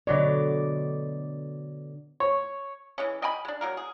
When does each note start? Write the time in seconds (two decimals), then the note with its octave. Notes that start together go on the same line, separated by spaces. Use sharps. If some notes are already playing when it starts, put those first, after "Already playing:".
0.07 B2 D3 F#3 C#5 D5
2.20 C#5
2.98 E3 G#3 C#4
3.22 D#5 G5 G#5 B5
3.45 G#3 D4
3.61 F#3 A#3 A#4
3.77 G#4